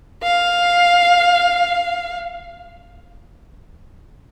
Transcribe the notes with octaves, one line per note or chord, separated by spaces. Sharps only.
F5